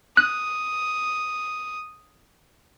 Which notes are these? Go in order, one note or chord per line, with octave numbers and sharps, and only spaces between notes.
D#6 F#6